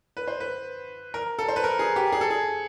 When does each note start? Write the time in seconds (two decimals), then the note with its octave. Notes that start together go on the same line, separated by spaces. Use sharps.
0.17 B4
0.28 C5
0.40 B4
1.14 A#4
1.39 A4
1.48 C5
1.56 B4
1.64 A#4
1.79 G#4
1.96 G4
2.12 G#4
2.21 A4
2.30 G#4